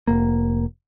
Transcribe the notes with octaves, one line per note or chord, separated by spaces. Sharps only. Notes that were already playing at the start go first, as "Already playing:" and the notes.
F1 A#3